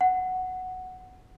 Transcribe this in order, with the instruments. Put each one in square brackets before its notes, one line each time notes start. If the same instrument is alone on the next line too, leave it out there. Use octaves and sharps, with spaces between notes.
[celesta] F#5